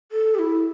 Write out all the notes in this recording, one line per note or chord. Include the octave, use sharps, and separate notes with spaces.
A4
G4
E4